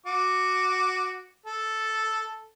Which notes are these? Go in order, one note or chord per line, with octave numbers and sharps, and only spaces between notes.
F#4 D6
A4